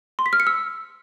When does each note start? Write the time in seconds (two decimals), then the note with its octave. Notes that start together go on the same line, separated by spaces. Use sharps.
0.19 C6
0.26 B6
0.33 F6
0.40 C#7
0.47 E6